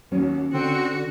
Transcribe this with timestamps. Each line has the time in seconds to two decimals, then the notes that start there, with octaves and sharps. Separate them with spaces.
0.12 D#2 F#3 C#4
0.54 D3 C4 F#4